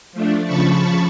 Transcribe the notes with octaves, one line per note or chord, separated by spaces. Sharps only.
F3 A3 D4
C#3 F3 A5 B5 C#6